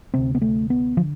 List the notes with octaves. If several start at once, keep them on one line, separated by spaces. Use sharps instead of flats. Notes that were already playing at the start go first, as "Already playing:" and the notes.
D2 C3 C4
B3
A3
B3
D3 F3